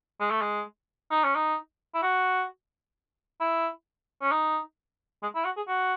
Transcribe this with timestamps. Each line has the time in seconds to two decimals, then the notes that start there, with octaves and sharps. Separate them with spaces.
0.20 G#3
0.31 A3
0.41 G#3
1.11 D#4
1.24 C#4
1.36 D#4
1.94 E4
2.02 F#4
3.40 E4
4.22 C#4
4.32 D#4
5.23 G#3
5.35 E4
5.45 F#4
5.57 G#4
5.67 F#4